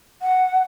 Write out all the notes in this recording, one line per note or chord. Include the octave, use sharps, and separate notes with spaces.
F#5